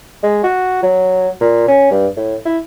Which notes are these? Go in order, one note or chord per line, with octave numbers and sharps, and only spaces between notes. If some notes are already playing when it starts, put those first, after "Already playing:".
G#3
F#4
F#3
A#2
C#4
G2
A2
E4